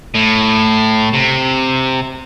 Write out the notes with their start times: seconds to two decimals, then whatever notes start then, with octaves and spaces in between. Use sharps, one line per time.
0.15 A2
1.13 C3